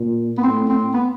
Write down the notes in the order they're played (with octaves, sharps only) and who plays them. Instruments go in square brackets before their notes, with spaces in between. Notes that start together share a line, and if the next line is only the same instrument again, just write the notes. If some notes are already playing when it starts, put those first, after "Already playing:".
Already playing: [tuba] A#2
[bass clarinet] B3
[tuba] A2 [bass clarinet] C4
[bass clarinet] C4
B3